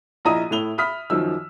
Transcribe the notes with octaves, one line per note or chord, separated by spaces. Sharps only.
A#1 E4 D#5 A#5 D#6 D#7
A2 E4 F7 G7
E5 B5 D#6 F6 B6
F#2 D#3 F3 E6